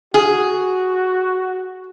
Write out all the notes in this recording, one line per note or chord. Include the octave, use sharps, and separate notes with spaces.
F#4 G#4